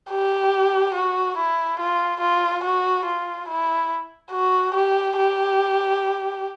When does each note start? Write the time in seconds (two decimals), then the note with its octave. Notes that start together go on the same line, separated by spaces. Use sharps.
0.10 G4
0.94 F#4
1.37 E4
1.80 F4
2.21 F4
2.63 F#4
3.05 F4
3.48 E4
4.32 F#4
4.74 G4
5.17 G4